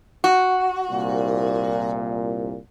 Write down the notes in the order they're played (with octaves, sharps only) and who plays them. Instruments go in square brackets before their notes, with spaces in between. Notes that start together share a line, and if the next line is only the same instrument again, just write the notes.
[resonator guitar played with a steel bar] F#4
[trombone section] C2 A#2